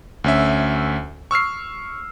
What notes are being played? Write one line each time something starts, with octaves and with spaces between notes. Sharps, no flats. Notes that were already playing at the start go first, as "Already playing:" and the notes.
D2 C#4 E5
C#6 E6 F6 C7